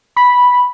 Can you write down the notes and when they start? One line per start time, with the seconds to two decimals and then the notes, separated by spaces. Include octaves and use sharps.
0.16 B5